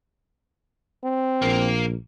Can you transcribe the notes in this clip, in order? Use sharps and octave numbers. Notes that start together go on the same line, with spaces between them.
C4
A#1 A#3 A#4